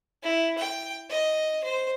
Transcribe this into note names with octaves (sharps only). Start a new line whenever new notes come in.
E4
G5
D#5
C5